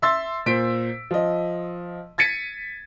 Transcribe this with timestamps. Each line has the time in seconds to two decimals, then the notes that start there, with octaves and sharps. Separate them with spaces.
0.02 E5 C6 E6 A6
0.46 A#2 C5 B6 D7
1.11 F3 D#5
2.18 G#6 A6 B6 C#7 D#7